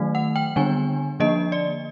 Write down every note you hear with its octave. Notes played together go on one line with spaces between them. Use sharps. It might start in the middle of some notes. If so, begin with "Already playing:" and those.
Already playing: D#3 F#3 A3
F#5
G5
D3 G3 B3 D4 G#5
D3 F3 A#3 D4 D#5
D5